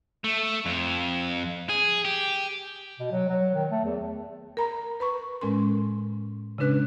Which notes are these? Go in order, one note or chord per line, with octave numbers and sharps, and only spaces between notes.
A3
F2
G#4
G4
B2
F#3
F#3
D#3
A3
E2
A#4 A#5 B5
B4 B5 C#6
A2 G#3 C#4 A#4 C6
C#3 G#3 C#4 D4 B4 F#6